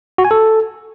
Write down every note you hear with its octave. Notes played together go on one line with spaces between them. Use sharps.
F#4
G#5
A4